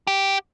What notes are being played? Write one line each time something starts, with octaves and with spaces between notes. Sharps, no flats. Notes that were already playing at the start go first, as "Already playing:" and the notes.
G4